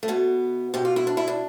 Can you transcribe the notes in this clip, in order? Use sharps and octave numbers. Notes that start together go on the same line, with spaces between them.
A3
B2 B3
B2 G4
F4
E4
D4
E4
D4